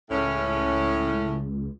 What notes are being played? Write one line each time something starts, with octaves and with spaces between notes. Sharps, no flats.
C#2 A2 C#4